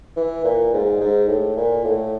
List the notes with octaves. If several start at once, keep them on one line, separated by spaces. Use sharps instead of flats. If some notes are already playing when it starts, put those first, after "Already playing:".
E3
A#2
G#2
G#2
A2
A#2
A2